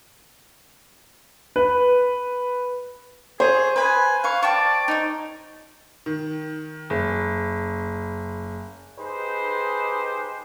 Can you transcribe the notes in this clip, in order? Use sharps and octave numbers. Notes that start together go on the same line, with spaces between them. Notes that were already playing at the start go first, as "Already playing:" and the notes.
B4
G#4 C5 C#5
B4 G#5 B5
B4 F5 C#6
D5 G5 A5 C#6
D#4 C#5
D#3
F#1
D#4 G4 G#4 B4 C5